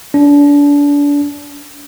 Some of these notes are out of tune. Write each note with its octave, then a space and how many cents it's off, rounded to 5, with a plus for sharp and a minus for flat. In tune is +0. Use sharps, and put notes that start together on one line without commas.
D4 -30